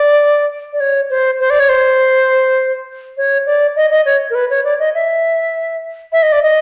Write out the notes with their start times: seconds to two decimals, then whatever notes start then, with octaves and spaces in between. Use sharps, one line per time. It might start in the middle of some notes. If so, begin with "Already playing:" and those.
Already playing: D5
0.73 D5
0.80 C#5
1.10 C5
1.40 C5
1.50 D5
1.60 C#5
1.69 C5
3.17 C#5
3.46 D5
3.76 D#5
3.91 D#5
4.06 C#5
4.30 A#4
4.35 B4
4.50 C#5
4.64 D5
4.79 D#5
4.95 E5
6.12 E5
6.23 D#5
6.32 D5
6.43 D#5